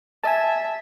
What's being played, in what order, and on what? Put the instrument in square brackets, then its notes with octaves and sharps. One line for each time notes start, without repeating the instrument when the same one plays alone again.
[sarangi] E5 [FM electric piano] G#5 A5